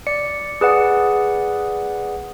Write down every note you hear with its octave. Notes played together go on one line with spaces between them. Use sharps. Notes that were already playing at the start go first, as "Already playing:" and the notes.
D5 C#7
G#4 B4 D5 F#5